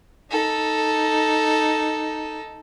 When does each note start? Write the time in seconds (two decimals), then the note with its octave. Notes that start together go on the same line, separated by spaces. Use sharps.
0.31 D#4 A4